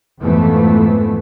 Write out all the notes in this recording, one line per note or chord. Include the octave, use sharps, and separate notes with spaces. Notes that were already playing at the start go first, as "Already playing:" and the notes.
F2 G#2 E3 F3 A3 B3